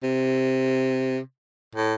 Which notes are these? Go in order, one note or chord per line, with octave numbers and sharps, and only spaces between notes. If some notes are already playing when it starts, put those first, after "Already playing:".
C3
A2